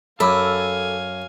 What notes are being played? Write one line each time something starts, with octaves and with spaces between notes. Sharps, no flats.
F#2 A4 F5 G#5 B5 D6 E6